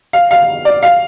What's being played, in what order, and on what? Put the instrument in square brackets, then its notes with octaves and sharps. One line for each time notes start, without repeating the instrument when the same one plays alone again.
[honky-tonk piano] F5
F5
D5
F5